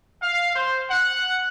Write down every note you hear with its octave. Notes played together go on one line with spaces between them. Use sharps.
F5
C5
F#5